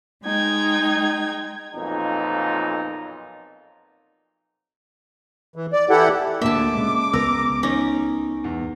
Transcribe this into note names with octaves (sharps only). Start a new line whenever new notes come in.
G#3 D#4 G5 G#6
B1 F2 A#2 D#4
E3
D5
E3 E4 G4 A4 F#5
D2 D3 A#3 E5 A5 D6
C#3 G#3
C#2 B3 A#4 E6
C#4 D#4
E2